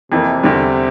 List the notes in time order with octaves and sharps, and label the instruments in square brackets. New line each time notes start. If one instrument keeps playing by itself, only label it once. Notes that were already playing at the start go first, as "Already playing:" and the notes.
[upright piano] F2 E3 A#3 [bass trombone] C3
[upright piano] E2 D3 G3